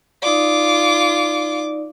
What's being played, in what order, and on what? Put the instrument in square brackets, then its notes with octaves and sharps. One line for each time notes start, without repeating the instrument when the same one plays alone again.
[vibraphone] D#4 D5 [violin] F4 D6